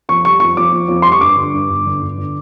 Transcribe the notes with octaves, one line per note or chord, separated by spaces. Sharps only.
F2 C#6
G3 C#6
F2 C#6
F2 D6
F2
F2
G3 C6
C#6
G2 D6
D3
G2
G1
D3
G1
D3